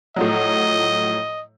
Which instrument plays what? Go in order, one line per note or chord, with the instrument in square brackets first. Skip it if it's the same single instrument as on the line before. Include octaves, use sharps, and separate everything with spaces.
[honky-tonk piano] A2 F3 F#3 [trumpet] D#5